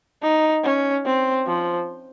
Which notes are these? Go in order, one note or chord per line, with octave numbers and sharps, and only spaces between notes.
D#4
C#4
C4
F3